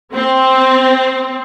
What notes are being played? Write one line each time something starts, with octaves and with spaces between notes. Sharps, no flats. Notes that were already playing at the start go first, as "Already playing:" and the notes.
C4